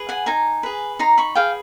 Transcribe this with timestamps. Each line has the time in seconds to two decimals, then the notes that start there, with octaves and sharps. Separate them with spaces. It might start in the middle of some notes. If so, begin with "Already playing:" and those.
Already playing: G#4 B4
0.09 F#5 G#5
0.26 D#4 G#5 A#5
0.63 G#4 B4
0.99 D#4 A#5 C6
1.18 B5 C#6
1.35 G#4 B4 F5 G5